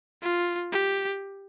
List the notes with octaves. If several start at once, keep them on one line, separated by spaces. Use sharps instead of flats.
F4
G4